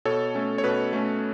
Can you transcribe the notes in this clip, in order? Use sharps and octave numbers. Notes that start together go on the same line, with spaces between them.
B2 A4 C#5
A3 C#4
C#5
B2 B4
A3 C#4